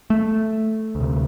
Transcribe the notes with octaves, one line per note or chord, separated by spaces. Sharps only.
A3
D2 C3